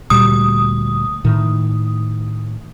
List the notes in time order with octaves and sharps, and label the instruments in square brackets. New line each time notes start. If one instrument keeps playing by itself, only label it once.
[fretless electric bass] D2 A#2 G3 [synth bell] D#6
[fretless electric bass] A2 D#3